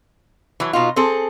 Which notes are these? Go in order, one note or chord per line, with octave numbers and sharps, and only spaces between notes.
E3 F#3
B2 D#4 F4
C4 G#4 A4